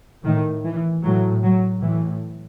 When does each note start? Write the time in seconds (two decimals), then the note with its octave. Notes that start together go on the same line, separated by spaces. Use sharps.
0.25 A2 D#3
0.65 E3
1.03 A2 F#3
1.42 F#3
1.81 A2 E3